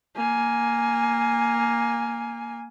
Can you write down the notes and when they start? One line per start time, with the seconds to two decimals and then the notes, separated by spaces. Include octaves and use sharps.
0.16 A#3 G#5